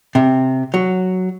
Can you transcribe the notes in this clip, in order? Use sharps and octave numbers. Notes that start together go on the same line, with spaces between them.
C3
F#3